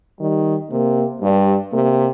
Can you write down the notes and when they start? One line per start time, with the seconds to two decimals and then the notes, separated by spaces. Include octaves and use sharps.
0.20 D#3 G3
0.71 C3 A#3
1.22 G2 G3
1.73 C3 A#3